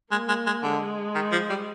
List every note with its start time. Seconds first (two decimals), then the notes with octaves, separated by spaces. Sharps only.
0.11 G#3 A#3
0.29 G#3
0.46 G#3
0.63 D3 G#3
1.15 D#3
1.32 F3
1.50 G3